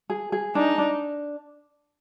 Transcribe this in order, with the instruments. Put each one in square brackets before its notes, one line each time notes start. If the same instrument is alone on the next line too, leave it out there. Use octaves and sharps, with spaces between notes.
[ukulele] G#4
G#4
[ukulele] D4 [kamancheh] D#4
[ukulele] D4